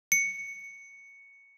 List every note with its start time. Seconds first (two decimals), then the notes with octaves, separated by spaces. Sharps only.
0.12 C#7